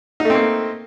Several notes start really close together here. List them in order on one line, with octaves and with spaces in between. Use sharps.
D#4 A3 C4 A#3